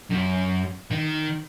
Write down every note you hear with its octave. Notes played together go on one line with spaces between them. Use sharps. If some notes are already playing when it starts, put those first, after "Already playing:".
F#2
D#3